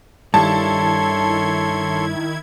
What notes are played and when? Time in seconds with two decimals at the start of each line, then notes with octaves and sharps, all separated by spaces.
0.34 G2 D#3 E4 A4 C#5 A5 C6 G#6